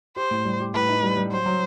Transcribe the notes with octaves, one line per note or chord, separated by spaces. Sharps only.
G4 C5
A2
G3
G4
A2 B4
D#4
G3
G3
F#3 C5
F#3